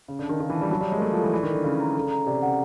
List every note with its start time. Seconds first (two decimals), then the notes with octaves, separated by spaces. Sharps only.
0.08 C#3 C#5
0.19 D3
0.24 A5
0.29 D#3
0.40 D#3 F5
0.50 E3
0.55 A5
0.61 G3
0.71 F#3 A5
0.81 G3
0.87 G#3 C#5
0.98 A#3
1.01 A3 A4
1.12 F3
1.18 A4
1.23 E3
1.33 E3 D5
1.43 D#3
1.49 A4
1.54 D3
1.64 C#3 A4
1.80 A#5
1.95 A4
2.11 A#5
2.26 C3 D5
2.42 C#3 F#5